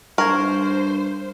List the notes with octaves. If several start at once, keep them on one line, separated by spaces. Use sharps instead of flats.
G2 A#4 C5 C#6 G#6